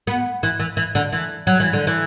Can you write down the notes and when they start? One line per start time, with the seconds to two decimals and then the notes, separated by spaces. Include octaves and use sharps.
0.07 B3
0.43 E3
0.60 E3
0.77 E3
0.95 D3
1.13 E3
1.47 F#3
1.60 E3
1.73 D3
1.87 E3